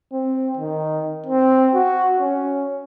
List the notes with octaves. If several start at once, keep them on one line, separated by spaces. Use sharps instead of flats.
C4
D#3
C4
F#4
C#4